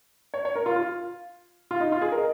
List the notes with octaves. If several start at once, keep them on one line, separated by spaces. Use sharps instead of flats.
C#5
C#5
A#4
F4
F4
F4
D#4
F4
G#4
A#4
D#5